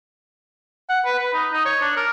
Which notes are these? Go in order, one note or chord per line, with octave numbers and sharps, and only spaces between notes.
F#5
B4
B4
D#4
D#4
C#5
D4
A#4